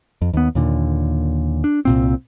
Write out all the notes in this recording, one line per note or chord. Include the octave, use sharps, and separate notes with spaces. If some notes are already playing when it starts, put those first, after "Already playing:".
F2
D#2 B3
D#2 A#2 D3
D4
C2 A#2 C4